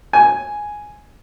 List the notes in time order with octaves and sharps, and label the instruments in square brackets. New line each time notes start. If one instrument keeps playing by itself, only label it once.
[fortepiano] G#5